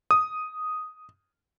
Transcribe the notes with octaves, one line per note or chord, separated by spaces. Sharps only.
D#6